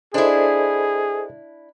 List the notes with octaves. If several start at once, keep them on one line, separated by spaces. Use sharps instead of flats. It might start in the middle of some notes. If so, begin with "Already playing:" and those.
D4 E4 G#4 A4 C5 D#5